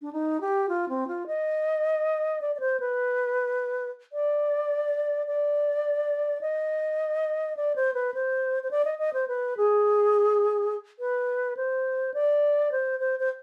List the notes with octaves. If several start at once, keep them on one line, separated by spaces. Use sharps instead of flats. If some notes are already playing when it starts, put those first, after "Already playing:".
D4
D#4
G4
F4
C4
F4
D#5
D5
D5
C5
B4
D5
D5
D#5
D5
C5
B4
C5
C5
D5
D#5
D#5
C5
B4
G#4
B4
C5
D5
C5
C5
C5